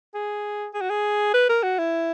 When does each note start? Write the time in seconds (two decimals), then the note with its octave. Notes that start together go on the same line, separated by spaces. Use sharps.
0.14 G#4
0.74 G#4
0.81 F#4
0.89 G#4
1.34 B4
1.49 A#4
1.63 F#4
1.79 E4